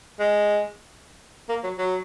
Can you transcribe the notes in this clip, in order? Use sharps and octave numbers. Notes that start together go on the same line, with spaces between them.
G#3
A#3
F#3
F#3